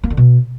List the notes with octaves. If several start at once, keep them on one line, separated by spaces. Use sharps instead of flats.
A#3
D3
B2